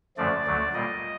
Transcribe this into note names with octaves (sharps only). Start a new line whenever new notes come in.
F#2 D3 F3 A3 D5
D2 D3 F#3 A3
A#2 G3 A#3 D#5